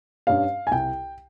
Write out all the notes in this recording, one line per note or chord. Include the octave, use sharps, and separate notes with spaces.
G2 G3 C#4 F5
G#5
C2 G5